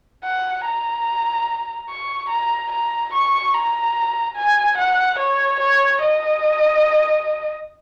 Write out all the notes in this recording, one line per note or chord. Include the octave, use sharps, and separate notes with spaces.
F#5
A#5
C#6
A#5
A#5
C#6
A#5
G#5
F#5
C#5
C#5
D#5